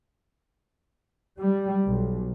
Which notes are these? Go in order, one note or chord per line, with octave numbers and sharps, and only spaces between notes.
G3
B1